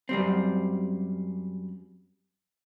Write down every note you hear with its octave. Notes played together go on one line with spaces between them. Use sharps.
F#2 G3 C4